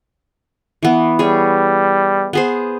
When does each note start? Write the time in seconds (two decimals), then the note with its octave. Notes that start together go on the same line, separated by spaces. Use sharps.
0.83 E3 B3
1.19 G3 G#4 C#5
2.33 B3 G#4 C5